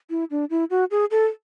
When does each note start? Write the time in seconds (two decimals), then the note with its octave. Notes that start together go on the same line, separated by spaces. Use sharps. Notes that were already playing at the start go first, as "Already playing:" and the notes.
0.10 E4
0.31 D4
0.50 E4
0.70 F#4
0.91 G#4
1.11 A4